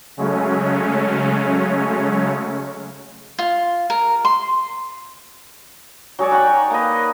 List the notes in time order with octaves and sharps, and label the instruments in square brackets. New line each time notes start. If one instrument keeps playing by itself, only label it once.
[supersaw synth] C#3 F#3 G#3 A3 C#4
[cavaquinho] F4
A#4
C6
[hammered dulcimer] F#3 G#4 C#5 D5
D#4 F#5 G5 C#6
A#3 D#4 B4 D#5